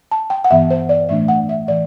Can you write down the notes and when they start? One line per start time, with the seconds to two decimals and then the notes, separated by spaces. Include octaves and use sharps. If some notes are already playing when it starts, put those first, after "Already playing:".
0.11 A5
0.30 G5
0.44 F#5
0.51 G2 E3 B3 E5
0.71 C5
0.89 D5
1.09 A2 E3 A3 D4 E5
1.28 F#5
1.49 E5
1.68 A2 E3 A3 D5